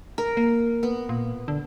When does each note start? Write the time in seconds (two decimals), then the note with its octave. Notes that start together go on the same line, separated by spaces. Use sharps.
0.18 A#4
0.37 A#3
0.83 B3
1.09 A#2
1.48 D3